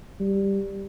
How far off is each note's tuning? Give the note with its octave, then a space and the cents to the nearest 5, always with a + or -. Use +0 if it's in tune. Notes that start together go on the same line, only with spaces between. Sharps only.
G3 +5